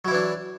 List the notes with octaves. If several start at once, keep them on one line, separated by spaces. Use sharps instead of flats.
E3 F#3 D4 E4